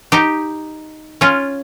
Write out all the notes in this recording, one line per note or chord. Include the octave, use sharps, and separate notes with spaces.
D#4 G4
C#4 F4